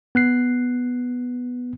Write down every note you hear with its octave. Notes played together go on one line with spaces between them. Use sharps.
B3 F#6 C7